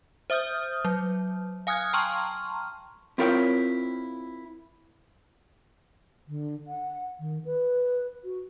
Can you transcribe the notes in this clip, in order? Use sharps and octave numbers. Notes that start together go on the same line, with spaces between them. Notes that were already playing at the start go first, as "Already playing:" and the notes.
C5 E5 D#6 F6 G6
F#3
F5 G#5 D#6 F6 F#6 G#6
G5 A5 A#5 C6 C#6 F6
C4 E4 F4 A#4 C#5 G5
D3
F#5
D#3
B4
F#4